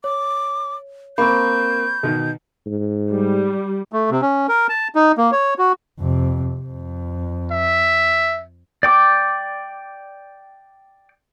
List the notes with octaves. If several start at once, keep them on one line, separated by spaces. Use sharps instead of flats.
C#5 D6
A#3 C4 B5 C#6 G6
B2 D#3
G#2
G3
A3
C3
C#4
A#4
A5
D#4
A#3
C#5
F#4
F2 C3
F2
E5
D5 G5 D6